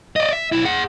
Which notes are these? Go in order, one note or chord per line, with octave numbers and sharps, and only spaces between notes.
D5 D#5
E5
B1 E4
G#4 F#5